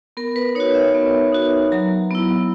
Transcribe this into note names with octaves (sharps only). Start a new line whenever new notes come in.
B3 A#4
B4
D#4 F#4 C#5
E5
B3
D#4 F#4
F#3 A#5
B3 E4